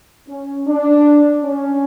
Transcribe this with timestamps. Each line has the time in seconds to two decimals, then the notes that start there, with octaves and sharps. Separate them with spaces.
0.27 C#4
0.67 D4
1.43 C#4